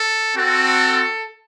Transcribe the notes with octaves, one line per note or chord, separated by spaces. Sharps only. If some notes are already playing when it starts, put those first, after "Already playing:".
Already playing: A4
C4 F#4 A4